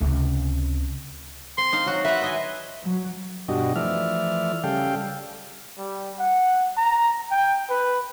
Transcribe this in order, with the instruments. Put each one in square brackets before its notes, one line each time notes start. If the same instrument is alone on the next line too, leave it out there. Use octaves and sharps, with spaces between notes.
[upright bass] C#2 C3
[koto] C4 [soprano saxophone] C6
[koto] D#4 F5
F#3 F#4
[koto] B4 F#5 [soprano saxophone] E5
[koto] B4 D#5 G#5
[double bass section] F#3
[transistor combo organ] G2 B2 D4 F#4 G4 D#5
E3 F3 A3 D5 E5 F6
C#3 G3 A4 F5 G5
[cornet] G3
F#5
A#5
G5
B4